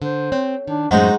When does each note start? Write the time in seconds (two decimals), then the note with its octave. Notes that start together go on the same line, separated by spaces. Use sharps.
0.02 D3 C5
0.32 C4 C#5
0.67 D#3 D4
0.91 F#2 A2 G#3 B3 D#4 F#4 C5 F#5